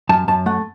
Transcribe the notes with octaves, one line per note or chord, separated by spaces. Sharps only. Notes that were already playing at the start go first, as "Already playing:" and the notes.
F#2 A5
F#2 A5
A3 F#5